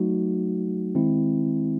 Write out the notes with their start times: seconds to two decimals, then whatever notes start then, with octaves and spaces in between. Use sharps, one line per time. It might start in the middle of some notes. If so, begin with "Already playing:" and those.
Already playing: F#3 A3 D#4 F#4
0.95 D#3 G#3 C4 E4